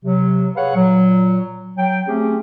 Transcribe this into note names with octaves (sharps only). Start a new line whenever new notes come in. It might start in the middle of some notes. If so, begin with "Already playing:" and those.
C3 F#3
G#4 B4 C#5 F5 F#5
A#2 F#3
F#3 G5
A3 C4 C#4 G4 G#4